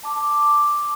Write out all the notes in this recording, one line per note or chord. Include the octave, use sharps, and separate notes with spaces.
A5 D6